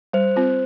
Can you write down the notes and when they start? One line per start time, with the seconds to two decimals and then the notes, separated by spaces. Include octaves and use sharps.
0.13 G3 C5
0.36 C4 F4